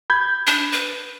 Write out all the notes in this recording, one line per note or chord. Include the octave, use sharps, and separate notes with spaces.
B5 G6 G#6
D4
B4